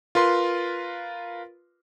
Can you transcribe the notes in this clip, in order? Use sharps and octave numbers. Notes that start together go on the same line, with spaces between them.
F4 A#4 B4 C6